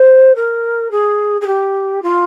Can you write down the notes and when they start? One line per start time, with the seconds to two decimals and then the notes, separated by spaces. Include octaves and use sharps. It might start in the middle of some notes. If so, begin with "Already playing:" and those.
Already playing: C5
0.35 A#4
0.90 G#4
1.41 G#4
1.46 G4
2.02 F4